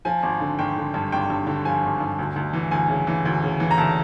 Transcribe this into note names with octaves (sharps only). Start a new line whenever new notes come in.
F3 G#5
G#1
D3
G#1 G5
D3
G2
G#1 G5
G2
D3
F3 G#5
G#1
G2
D2
D2
E3
D2 G#5
C#3
E3
D2
C#3
E3
A#5
D2 A5